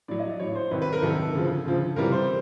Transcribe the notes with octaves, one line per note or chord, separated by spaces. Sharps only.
A2 F#3 D5
D#5
D5
A2 F#3 C#5
C5
C2 C3 D#3 F#3 B4
B4
A#4
C2 C3 D#3 F#3 A4
D2 C#3 F3
D2 C#3 F3
C#2 C3 E3 G3 A#4
C5